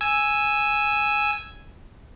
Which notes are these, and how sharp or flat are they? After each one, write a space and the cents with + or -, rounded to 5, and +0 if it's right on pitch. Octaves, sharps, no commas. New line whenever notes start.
G#5 +0 E6 +0